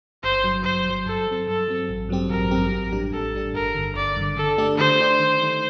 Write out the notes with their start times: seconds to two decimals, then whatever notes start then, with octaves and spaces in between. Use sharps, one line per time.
0.23 G1 C5
0.44 G2 F#3
0.64 G1 C5
0.86 G2 F#3
1.06 G2 A4
1.27 F#3 C4
1.47 G2 A4
1.68 F#3 C4
1.89 A1
2.09 G2 F#3 C4 G4
2.30 A1 A#4
2.51 G2 F#3 C4 G4
2.71 A1
2.92 A2 G3 D4 G4
3.12 A1 A4
3.34 A2 G3 D4 G4
3.54 G1 A#4
3.75 G2 D3
3.96 G1 D5
4.16 G2 D3
4.36 D3 A4
4.58 A3 D4 G4 D5
4.78 D3 C5
4.99 A3 D4 G4 D5
5.20 D#3
5.41 A3 D#4